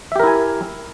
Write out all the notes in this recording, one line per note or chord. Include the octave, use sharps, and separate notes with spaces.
E4 G4 A#4 E5 G#5